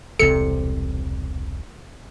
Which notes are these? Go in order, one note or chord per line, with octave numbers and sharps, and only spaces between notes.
E1 C2 C3 A4 C#7